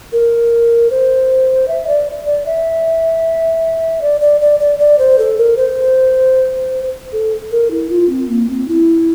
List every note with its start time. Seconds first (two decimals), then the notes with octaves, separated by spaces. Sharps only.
0.12 A#4
0.90 C5
1.68 E5
1.87 D5
2.26 D5
2.46 E5
4.01 D5
4.21 D5
4.41 D5
4.60 D5
4.79 D5
4.99 C5
5.19 A4
5.38 A#4
5.57 C5
7.13 A4
7.52 A#4
7.71 E4
7.90 F4
8.09 C4
8.29 A#3
8.49 C4
8.68 E4